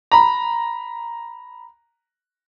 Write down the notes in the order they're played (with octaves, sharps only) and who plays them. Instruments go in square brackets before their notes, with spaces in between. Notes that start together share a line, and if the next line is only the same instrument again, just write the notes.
[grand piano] A#5 B5